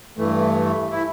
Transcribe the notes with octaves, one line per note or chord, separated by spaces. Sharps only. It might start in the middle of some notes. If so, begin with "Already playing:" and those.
G2 E3 A3
E4